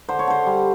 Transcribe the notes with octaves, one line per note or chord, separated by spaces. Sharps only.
D3 C5
C#5
D3 C5
G3